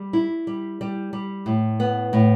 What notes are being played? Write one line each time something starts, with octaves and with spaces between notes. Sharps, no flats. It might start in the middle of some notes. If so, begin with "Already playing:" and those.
Already playing: G3
E4
G3
G3
G3
A2
B3
A2